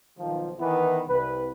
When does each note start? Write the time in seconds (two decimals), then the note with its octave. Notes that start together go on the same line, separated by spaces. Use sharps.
0.18 B1 D#3 F3
0.59 D#3 E3 B3 E4 B4
1.07 C2 B4